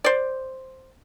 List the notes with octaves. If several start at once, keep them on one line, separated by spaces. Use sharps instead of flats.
C5 D5